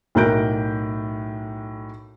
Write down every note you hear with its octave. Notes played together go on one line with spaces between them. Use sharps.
B1 A2 A#4 F#6 G6 D7